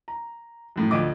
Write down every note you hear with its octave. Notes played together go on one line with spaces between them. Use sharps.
A#5
F#2 A2
D2 F3 D#5 D6